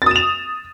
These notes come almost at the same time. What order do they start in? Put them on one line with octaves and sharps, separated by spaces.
A6 D#6 E7 F7